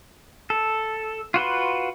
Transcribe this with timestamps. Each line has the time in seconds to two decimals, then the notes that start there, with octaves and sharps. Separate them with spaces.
0.50 A4
1.34 F4 F#4 B4 C6